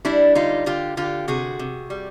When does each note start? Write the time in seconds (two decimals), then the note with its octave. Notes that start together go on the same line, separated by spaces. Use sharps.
0.05 G3 D4 E4
0.35 D3 D#4 F4
0.66 D3 F4 G4
0.97 D3 F4 G4
1.28 C3 F#4 G#4
1.59 C3
1.90 G3